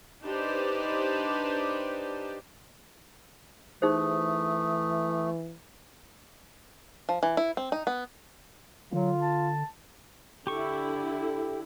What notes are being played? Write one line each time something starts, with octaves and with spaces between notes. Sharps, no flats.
D4 D#4 G4 B4 C5 D5
E3 A3 D#4 G#4 C5 D#6
F3
E3
E4
C4
D#4
B3
D3 F#3 F4
A5
D3 E4 G4 C#6